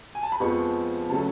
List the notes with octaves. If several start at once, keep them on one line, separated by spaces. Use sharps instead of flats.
G#5
A5
B5
F2 F3 G#3 B3 C#6
C#3 F#3 A3 C#4 A5